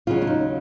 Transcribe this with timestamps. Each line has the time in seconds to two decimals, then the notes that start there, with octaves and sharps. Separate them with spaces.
0.07 D#2 C#3 F#3 F4
0.22 D4
0.27 D#4